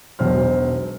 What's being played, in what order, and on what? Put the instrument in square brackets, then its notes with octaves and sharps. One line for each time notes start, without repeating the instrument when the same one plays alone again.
[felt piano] E1 B1 C5 F6